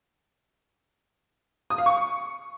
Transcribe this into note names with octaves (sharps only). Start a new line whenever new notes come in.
D#6
F5
C#6